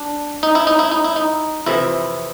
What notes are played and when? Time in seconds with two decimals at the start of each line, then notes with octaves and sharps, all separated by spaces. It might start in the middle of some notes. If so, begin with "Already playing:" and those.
Already playing: D4
0.43 D#4
0.55 E4
0.67 D#4
0.79 E4
0.92 D#4
1.04 E4
1.16 D#4
1.66 F2 C3 E3 E4